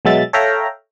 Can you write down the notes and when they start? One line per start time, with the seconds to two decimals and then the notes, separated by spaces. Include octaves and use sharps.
0.05 B2 F#3 G#3 E5 A6
0.33 A4 C#5 E5 F5 G5 A#5